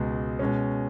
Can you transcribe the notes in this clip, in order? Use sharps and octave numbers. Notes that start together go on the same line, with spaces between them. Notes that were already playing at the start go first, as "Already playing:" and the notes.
Already playing: C#2 B2 G#3
B2 G#3 C#4